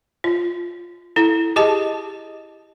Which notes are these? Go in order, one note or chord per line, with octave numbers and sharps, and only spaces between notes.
F4
E4 A4
G4 G#4 D#5 A5